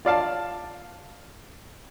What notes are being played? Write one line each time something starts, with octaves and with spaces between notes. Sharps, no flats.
F4 D5 F5 A5